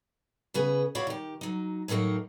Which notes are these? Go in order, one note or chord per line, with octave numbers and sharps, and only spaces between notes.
C#3 B3 G#4 B4
E4 F#4 C#5 D5 F5
D#3 G4
F#3 D#4
A2 D#3 F#3 A#3 D#4